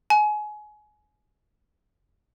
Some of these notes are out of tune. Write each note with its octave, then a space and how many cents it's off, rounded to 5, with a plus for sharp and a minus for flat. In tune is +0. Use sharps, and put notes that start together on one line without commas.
G#5 +25